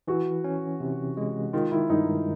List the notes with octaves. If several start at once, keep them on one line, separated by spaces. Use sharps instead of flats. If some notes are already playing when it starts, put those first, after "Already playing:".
E3 F#4
C#4
C3
G#3
D#3 F4
E4
G2 D#4